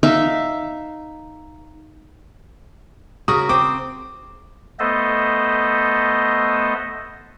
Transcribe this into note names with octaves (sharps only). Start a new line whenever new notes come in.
D#4 E5 F5
C#3 F#4 A#4 D#6
C4 G5 D6
A3 B3 A4 C5 D#5